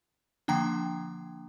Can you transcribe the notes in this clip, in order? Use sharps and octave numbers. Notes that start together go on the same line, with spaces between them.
D3 F3 A#3 D4 G5 A#5